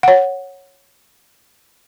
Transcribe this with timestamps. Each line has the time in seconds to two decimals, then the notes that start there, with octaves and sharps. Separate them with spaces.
0.03 C#5 F#5